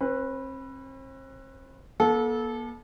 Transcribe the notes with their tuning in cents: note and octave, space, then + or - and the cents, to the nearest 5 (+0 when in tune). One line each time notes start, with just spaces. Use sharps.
C4 +40 B4 -5
A#3 +45 A4 -20